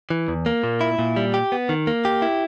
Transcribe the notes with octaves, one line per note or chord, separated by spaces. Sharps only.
E3
E2
A#3
A#2
E4
A#2
G3
G4
B3
D#3
A#3
G4
E4